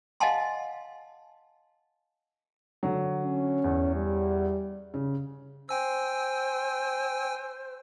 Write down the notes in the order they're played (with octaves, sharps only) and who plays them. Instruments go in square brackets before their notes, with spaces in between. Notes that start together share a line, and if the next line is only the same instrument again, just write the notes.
[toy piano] D#5 F5 F#5 G#5 A5 C6
[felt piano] D3 F#3
[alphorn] C#4
[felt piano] E2
[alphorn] G3
[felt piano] C#3
[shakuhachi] C5 [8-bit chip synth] G5 G#5 E6